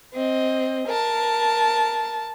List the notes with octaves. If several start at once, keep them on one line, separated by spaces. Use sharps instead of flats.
C4 D#5
A#4 A5